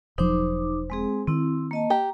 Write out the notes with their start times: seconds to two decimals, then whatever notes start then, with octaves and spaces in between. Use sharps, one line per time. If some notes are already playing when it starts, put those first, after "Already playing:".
0.18 E1 F3 F#3 D#4 C5 D6
0.90 G#3 C4 G#4
1.27 D#3 C4 E4
1.71 A#3 D#5 A5
1.90 G4 A#5